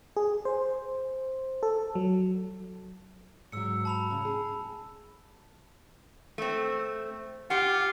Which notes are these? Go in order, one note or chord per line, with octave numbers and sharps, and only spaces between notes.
G#4
C5
A4
F#3
G#2 F#3 E6 C#7
A5 B5 F7
C#3
G#4
A3 C4
F4 G4 F#5